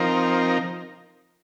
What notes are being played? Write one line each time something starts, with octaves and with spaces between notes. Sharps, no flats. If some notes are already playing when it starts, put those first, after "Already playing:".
Already playing: F3 C4 D#4 A#4